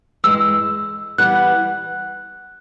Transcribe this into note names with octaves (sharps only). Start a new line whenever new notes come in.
G2 E3 G#3 E6
E3 G3 B3 F#6